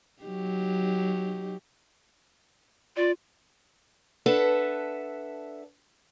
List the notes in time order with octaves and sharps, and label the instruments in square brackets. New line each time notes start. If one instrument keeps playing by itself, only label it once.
[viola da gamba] F#3 D#4 G4
[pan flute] F4 [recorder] D5
[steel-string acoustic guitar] D4 A4 B4 E5 F#5 A5